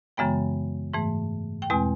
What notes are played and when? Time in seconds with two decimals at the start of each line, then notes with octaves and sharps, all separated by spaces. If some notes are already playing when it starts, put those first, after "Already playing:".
0.17 F#2 C#3 E3 G#3 B3 G5
0.94 G#2 E3 A3
1.62 G5
1.70 E2 B2 G#3 C4 G#5